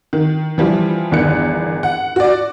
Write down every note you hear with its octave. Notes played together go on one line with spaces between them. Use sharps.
D#3
E3 F3 G3
G1 E2 D#3 F#6 C#7
F#5
F#4 D5